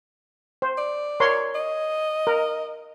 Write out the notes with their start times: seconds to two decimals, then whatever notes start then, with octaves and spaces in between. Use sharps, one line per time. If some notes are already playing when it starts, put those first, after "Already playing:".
0.62 C5
0.78 D5
1.20 A#4 C#5 C6
1.55 D#5
2.27 A#4